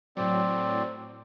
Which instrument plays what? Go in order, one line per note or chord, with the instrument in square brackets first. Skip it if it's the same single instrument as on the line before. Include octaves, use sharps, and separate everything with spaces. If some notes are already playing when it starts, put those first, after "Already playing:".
[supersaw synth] A2 F#3 [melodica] C4 D5